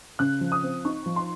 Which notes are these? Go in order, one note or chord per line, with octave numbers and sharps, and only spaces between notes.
C#3 F#6
F3
D#6
C4
D#4 C#6
F3
C6